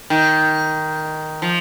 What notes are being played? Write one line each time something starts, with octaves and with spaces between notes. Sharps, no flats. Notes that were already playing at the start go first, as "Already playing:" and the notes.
D#3
F3